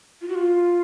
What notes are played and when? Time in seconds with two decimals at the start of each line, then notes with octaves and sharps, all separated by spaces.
0.21 F4
0.29 F#4
0.35 F4